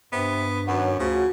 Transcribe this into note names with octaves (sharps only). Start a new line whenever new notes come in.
G2 C3 B3
F#2 D#3 F#3 B3 C#5
D2 C#3 F3 F#4